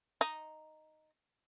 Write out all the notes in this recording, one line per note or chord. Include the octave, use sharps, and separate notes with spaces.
D#4